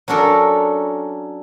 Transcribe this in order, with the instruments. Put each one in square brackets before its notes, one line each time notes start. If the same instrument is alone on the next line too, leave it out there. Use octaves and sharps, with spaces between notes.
[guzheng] F#3 C#4 D4 A4 A#4